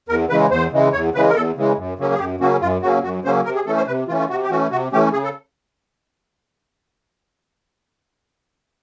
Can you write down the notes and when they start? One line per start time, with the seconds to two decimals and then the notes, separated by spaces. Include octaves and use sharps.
0.09 E2 A#4
0.30 C#3 E3 G#3 B4
0.50 E2 C5
0.72 C#3 E3 G#3
0.93 E2 C#5
1.14 C#3 E3 G#3 B4
1.29 A#4
1.35 E2 A4
1.56 C#3 E3 G#3
1.77 F#2
1.99 C#3 F#3 A#3 C#4
2.14 G#4
2.19 F#2 G4
2.40 C#3 F#3 A#3 C#4 F#4
2.61 F#2 F4
2.82 C#3 F#3 A#3 C#4 F#4
3.03 F#2 F#4
3.24 C#3 F#3 A#3 C#4 C5
3.45 C3 A#4
3.55 G#4
3.66 E3 A3 C#4 A4
3.77 C5
3.87 C3 B4
4.08 E3 A3 C#4 F4
4.19 F4
4.29 C3 F#4
4.43 G4
4.50 E3 A3 C#4 F#4
4.71 C3 F#4
4.92 E3 A3 C#4 G4
5.13 C#3 G#4
5.24 A4